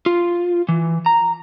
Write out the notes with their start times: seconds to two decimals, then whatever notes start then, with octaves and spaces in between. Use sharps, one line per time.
0.06 F4
0.69 E3
1.06 A#5